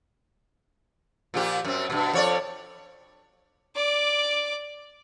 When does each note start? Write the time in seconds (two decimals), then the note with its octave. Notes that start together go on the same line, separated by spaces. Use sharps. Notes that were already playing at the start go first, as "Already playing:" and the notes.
1.34 A#2 F3 G4
1.65 F#2 C4
1.90 G2 B2
2.13 F2 C#5 D5
3.76 D5 D6